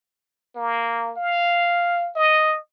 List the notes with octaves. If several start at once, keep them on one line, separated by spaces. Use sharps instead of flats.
A#3
F5
D#5